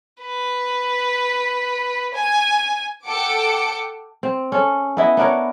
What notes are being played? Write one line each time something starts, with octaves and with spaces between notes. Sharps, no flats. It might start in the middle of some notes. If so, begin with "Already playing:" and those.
B4
G#5
A4 F#5 G5 D6 C#7
C4
C#4 A4
B3 E4 D#5
B3 D4 A#4 C#5